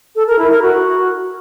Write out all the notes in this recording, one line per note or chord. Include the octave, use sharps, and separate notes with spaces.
A4
A#4
E4
A#4
F#4